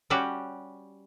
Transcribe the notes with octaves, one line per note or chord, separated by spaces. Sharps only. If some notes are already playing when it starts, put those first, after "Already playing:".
G3 C#4 F#4 G4